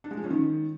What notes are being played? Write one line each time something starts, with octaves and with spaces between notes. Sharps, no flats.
D4
G#3
F3
C#4
D#3